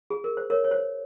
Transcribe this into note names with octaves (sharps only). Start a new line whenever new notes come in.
G#4
A#4
C5
A#4 C#5
C#5
C5